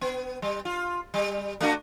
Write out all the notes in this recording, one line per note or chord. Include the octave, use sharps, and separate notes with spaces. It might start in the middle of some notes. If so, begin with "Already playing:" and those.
B3
G3
F4
G3
A3 D4 F#4